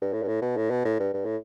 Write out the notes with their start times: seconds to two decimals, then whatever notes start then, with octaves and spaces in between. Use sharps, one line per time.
0.02 G2
0.13 A2
0.23 G2
0.28 A2
0.42 B2
0.57 A2
0.70 B2
0.85 A2
0.99 G2
1.14 G2
1.25 A2